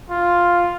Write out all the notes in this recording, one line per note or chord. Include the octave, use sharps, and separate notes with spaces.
F4